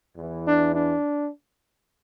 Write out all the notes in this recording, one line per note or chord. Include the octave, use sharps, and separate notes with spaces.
E2 E3
D4
D4